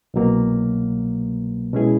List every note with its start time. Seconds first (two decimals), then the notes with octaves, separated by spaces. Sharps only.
0.14 C2 B2 F#3 A#3
1.73 B2 G#3 C#4 E4 G#4